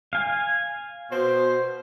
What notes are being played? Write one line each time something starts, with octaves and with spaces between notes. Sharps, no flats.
F5 G#5
B2 C5